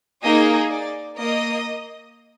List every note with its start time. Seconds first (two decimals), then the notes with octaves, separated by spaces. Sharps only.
0.22 A#3 D#4 G#4 D#5
0.70 D5
1.19 A#3 D#5